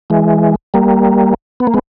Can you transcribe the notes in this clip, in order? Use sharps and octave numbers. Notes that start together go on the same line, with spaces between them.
E3 G#3
G3 A#3
B3
A#3
G#3 B3